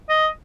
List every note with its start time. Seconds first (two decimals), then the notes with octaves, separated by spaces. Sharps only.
0.09 D#5